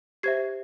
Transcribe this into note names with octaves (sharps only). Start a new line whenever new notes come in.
G4 C5 E5 G#6 C7